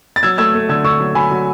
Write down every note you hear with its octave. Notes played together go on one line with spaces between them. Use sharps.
A6
F#3 E6 G#6
A3 E6 G#6
A3
D3 E6 G#6
D3 C#6 E6
F#3
F#3 G#5 B5
F#3